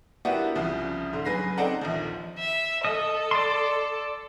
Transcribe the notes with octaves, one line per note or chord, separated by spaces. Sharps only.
A#3 B3 D4 E4 F#4 G4
C2 C#3 F3
G#2 D3
C#3 F#3 G#4 B4 A#6 C7
C4 D#4 A4 D5 F#5 A#5
A#1 D#2 F3
E5
A4 D#5
D5 C6